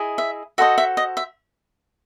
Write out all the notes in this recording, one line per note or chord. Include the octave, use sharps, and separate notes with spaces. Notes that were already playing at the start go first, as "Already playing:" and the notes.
Already playing: E4 G#4 D#5
E5
F#4 A4 C5 D#5 E5
E5
D#5
E5